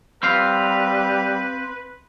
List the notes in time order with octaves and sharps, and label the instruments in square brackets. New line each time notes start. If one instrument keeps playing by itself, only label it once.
[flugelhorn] G3 [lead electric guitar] C4 F5 [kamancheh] B4